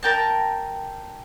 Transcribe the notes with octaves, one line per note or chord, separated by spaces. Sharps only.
A#4 G5 A5